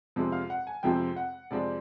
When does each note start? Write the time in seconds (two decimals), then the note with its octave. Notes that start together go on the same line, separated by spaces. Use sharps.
0.16 F2 C3 F3 G#3 C4
0.32 F5
0.50 F#5
0.67 G#5
0.83 F2 C3 F3 G#3 C4 G5
1.16 F#5
1.51 F2 C3 F3 G#3 C4 D5